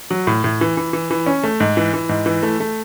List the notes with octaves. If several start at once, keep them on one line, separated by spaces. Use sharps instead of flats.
F#3
A2
A2
E3
E3
E3
E3
C#4
A3
G#2
E3
E3
G#2
E3
A3
A3